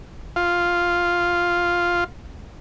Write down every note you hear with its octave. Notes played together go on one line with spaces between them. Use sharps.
F4 F5